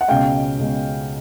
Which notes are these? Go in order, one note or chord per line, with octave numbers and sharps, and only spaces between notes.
F#5
C#2 B2 G#3 C#4 F5 G5
C#2 B2 G#3 C#4